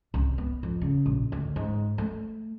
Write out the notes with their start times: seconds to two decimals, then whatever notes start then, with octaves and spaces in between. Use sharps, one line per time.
0.14 C2
0.38 B3
0.63 F2
0.81 C#3
1.06 A#1
1.32 D2
1.56 G#2
1.98 A3